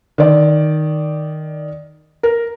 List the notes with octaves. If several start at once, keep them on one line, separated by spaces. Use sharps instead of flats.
D#3 D5
A#4